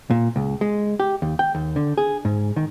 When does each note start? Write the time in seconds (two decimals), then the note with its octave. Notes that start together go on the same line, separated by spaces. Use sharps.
0.10 A#2
0.36 C#2
0.61 G#3
1.00 G4
1.22 D#2
1.39 G5
1.55 D#2
1.76 D3
1.98 G#4
2.25 G#2
2.56 D#3